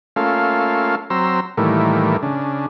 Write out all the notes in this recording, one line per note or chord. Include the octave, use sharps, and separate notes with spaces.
A3 A#3 C#4 F4 A4 F5
F#3 C4 A#5 C6 E6
A2 D#3 E3 G3 A3 A#3
C#3 D4